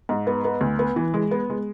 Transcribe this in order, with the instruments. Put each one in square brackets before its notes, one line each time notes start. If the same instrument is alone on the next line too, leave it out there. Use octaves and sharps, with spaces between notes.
[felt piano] G#2
B3
B3
D2
B3
E3
G#3
B3
G#3